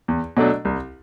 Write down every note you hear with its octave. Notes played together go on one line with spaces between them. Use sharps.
E2
B2 F#3 A3 D4
C2